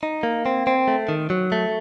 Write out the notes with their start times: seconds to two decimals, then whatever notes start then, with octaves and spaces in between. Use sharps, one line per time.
0.03 D#4
0.23 A#3
0.46 C4
0.67 C4
0.88 A3
1.09 D#3
1.30 F#3
1.52 A3